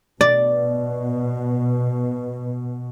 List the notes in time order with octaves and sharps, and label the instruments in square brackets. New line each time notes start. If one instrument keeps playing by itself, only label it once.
[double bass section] B2 [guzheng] D5